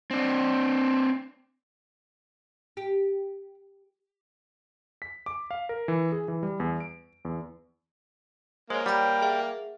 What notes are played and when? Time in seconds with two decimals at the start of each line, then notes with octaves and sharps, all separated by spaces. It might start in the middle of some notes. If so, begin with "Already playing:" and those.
0.11 C4 D4
2.77 G4
5.02 B6
5.26 D6
5.51 F5
5.69 A#4
5.88 E3
6.12 G#4
6.28 E3
6.43 G3
6.60 E2
6.80 D7
7.25 E2
8.70 G#3 A#3 C5 C#5
8.86 G3 F#5 G5 A#5 B5
9.22 G#4 E5 F#5